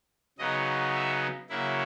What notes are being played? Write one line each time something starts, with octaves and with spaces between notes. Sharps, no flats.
C#3 F#3 B3 D#4 D#5
E5
C#3 F#3 A#3 E4 E5